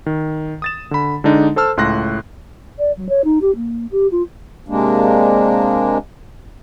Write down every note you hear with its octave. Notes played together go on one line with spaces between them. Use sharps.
D#3
D#6 A6 E7
D3 B5
D3 G#3 D4 D#4
A4 C5 A5 E6 F6
C#2 A2 C6 F#6 A#6
D5
F#3
C#5
D#4
G4
A#3
G4
F4
C3 G#3 A#3 D4